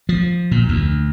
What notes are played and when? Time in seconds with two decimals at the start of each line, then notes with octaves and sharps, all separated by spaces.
0.09 F3
0.51 A#2
0.69 D2